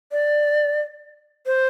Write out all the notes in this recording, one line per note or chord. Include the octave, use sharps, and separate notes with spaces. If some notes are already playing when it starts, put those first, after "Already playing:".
D5
C5